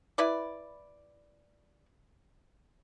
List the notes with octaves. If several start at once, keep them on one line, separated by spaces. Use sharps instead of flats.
E4 B4 D5